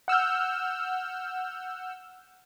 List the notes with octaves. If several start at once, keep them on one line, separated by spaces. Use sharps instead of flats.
F#5 E6 F6 G6